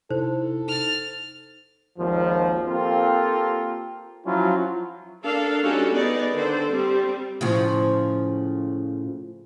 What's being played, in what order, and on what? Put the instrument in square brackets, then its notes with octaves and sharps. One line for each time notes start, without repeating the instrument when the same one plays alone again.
[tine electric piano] C3 D#4 E4 [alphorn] A4 [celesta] C5
[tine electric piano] D#4 [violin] F6 A6
[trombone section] G#1 D#2 F3
A#3 C4 F4 G4 A4
F3 F#3 C#4 E4 F4
[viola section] D4 A4 A#4 F5
G3 C#4 D#4 F#4 G4 A4
B3 D#4 G#4 D5
D3 D#3 A4 C5 D5
G3 C4
[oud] A2 C#3 F3